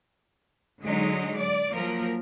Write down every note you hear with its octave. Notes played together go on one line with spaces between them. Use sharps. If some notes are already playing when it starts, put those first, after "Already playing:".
D3 F#3 G#3 D#4
D5
F3 F#3 A#3 A#4